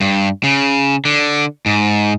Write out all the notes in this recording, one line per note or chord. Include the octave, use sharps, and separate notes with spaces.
G2
C#3
D3
G#2